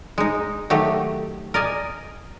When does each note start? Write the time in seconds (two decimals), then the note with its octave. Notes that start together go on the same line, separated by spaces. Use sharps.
0.18 G#3 D#4
0.70 D#3 F#3 A3 G4
1.54 A#4 D5 D#5 G#5